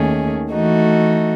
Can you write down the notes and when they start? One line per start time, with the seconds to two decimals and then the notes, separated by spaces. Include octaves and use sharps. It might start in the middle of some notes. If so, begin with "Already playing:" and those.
Already playing: D#2 D#3 A3 C#4 G#4
0.51 E3 A3 D#4 F#4